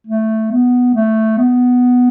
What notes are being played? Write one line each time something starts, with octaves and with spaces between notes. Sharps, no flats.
A3
B3
A3
B3